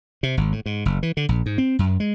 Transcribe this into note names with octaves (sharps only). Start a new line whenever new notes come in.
C3
G#1
A2
G#2
F#1
E3
D3
A#1
G#2
C4
F#2
G#3